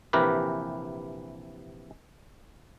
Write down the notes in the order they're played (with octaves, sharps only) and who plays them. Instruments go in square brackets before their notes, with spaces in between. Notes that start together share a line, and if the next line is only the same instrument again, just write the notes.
[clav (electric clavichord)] A#1 C3 E3 G4 A#4 B4